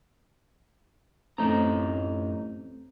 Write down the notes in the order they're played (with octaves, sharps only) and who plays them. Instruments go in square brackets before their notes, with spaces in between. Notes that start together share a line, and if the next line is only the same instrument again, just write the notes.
[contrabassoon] A1 [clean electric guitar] F#2 D#4 A#5 [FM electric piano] A3 C4